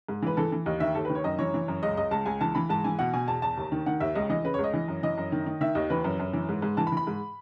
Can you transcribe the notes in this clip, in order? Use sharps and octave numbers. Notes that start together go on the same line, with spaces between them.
G#2
E3 B4
E3 A4
E3
D#2 D#5
D#3 E5
D#2 A4
D#3 B4
C#5
F#2 D#5
E3 C#5
E3
F#2
C#2 D#5
C#2 D#5
C#2 A5
C#2 G#5
E3 A5
E3 B5
G#2 A5
E3 G#5
B2 F#5
B2 G#5
E2 A5
E2 A5
D#2
D#3
D#3 F#5
D#2 E5
C#2 D#5
E3 D#5
C#3 B4
C#2 C#5
D#5
E3
F#2
E3 D#5
F#2
D#3
D#3
D#3 E5
D#2 D#5
E3 B4
F#2
F#2
E3
G#2
G#2
E3 A5
B5
E3
B5
G#2